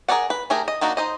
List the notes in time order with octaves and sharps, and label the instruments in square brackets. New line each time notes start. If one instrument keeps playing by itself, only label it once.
[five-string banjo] G#4 A#4 C#5 D5 F#5
B4
A3 G4 G#4 A#4
D#5
A#3 D4 D#4 F#4
D#4 C5 D#5